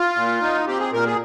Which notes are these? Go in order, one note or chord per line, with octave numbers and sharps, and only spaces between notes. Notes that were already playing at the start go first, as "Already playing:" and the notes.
Already playing: F4
A#2
D#4
C4 G4
G#4
A#2 A#4
G#4